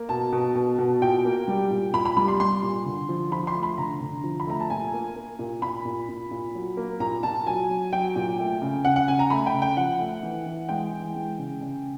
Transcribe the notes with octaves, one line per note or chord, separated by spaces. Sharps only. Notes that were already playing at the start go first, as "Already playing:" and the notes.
Already playing: A#3
B2 A5
B2
B2
B2
A#2 G5
A#3
G3
A#2
A#2 B5
B5
G3 B5
C6
G3 C6
A#2
D3
F3
F3 B5
C6
A3
B5
D3 A#5
D3
F3
B5
A3 A#5
A5
A#2 G#5
A#3
A#3
A#2
A#2 B5
A#2
A#2
A#2
F#3
A#3
A#2 A#5
A#2 A5
F#3 G#5
F#3
F#3 G5
A#2
A3
C#3
C#3 F#5
F#5
C#3 G#5
A#5
A3 B5
G5
C#3
G5
F3 F#5
A3
E3
E3
G#3 G5
E3
G#3
C#3
C#3